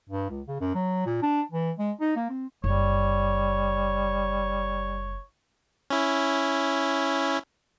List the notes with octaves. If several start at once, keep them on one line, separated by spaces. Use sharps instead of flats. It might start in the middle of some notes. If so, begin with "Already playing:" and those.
G2
C#2
C#3
F#2
F#3
A#2
D4
E3
G#3
D#4
A#3
C4
F#1 G3 C#5
C#4 E4